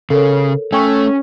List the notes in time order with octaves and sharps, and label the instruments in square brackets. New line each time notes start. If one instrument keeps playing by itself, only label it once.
[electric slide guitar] C#3 [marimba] A4 A#4 C#5
[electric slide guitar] A3 [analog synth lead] C#4 [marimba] G5 C#6